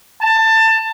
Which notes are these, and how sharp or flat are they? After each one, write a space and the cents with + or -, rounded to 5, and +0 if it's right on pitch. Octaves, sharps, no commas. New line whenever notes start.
A5 +20